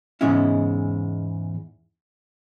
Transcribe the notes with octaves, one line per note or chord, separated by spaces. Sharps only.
E2 G#2 C#3 G#3 C#4 E4